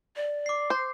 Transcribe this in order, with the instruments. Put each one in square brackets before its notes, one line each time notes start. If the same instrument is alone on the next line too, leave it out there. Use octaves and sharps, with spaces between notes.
[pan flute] D5
[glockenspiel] D6 C7
[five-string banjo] C5